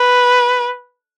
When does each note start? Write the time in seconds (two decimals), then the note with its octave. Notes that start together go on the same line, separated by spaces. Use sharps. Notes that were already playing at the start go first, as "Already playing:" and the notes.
Already playing: B4